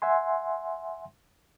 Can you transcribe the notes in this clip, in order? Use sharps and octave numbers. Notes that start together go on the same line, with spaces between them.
E5 F#5 G#5 C6